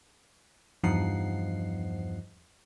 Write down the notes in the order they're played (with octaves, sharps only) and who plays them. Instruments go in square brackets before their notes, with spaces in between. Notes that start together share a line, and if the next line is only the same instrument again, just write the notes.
[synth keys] E2 G2 F3 D#4 F#5 C7